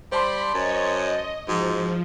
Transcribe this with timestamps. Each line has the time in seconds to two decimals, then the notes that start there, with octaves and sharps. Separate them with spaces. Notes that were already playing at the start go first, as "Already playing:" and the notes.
0.12 G3 C5 A5 B5 C6
0.54 F#2 C#5 D#5
0.84 D#5
1.49 G#2 F3 F#4